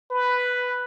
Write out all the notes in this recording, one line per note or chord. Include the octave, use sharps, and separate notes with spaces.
B4